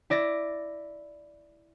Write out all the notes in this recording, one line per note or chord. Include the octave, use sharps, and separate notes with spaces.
E4 D5 A#6